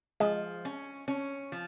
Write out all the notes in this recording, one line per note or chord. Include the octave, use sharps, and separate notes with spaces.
F3 G#3
C#4
C#4
F3